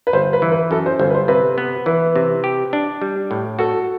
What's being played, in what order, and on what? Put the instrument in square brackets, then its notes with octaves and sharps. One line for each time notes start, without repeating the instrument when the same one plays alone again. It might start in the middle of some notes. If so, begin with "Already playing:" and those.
[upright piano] B4
[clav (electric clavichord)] G1 [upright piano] C5
[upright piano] B4
[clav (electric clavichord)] E3
[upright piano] B4
[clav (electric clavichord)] F#2 [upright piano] A4
[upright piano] C5
[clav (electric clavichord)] G1 [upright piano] C5
[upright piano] B4
C5
[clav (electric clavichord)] C3 [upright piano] B4
[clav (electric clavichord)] B3
[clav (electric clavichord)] E3 [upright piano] B4
[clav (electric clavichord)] C3
G4
D4
G3
A2
[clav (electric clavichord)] F#4 [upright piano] A4